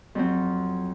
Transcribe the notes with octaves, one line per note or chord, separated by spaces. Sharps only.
F2 F#3 C4